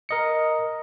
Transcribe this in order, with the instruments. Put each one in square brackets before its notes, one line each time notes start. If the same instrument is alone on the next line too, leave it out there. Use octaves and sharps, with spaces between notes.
[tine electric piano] A#4 D#5 C#7